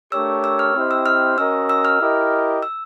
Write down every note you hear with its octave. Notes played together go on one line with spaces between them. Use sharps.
A3 D4 G4 A#4 C#5 E6
E6
F6
C4 E4 G4 C5 D#5
E6
F6
C#4 F#4 A#4 D#5 E6
E6
F6
E4 G4 A#4 D#5
E6